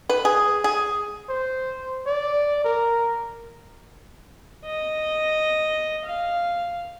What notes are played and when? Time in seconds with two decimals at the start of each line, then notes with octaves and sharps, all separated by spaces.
0.09 B4
0.25 G#4
0.64 G#4
1.30 C5
2.07 D5
2.64 A#4
4.65 D#5
6.05 F5